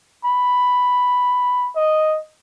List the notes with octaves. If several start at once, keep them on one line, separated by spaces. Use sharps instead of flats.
B5
D#5